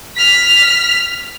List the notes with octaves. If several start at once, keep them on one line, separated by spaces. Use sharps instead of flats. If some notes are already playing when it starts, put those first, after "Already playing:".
F6 B6